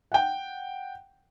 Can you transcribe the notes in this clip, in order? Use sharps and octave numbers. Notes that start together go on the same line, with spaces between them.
F#5 G5